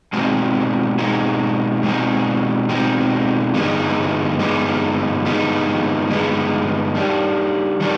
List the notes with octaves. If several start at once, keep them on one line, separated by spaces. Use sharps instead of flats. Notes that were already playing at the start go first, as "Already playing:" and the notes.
B2 G#3 C4 D#4
B2 G#3 C4 D#4
B2 G#3 C4 D#4
B2 G#3 C4 D#4
G2 D3 G#3 B3 D#4
G2 D3 G#3 B3 D#4
G2 D3 G#3 B3 D#4
G2 D3 G#3 B3 D#4
D#3 G3 D4
D#3 G3 D4